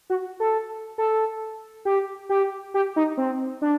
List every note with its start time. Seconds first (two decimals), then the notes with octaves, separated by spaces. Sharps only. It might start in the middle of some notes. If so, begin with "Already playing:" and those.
0.10 F#4
0.40 A4
0.98 A4
1.85 G4
2.29 G4
2.74 G4
2.96 D#4
3.17 C4
3.62 D4